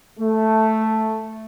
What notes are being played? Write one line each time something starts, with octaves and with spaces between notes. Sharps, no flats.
A3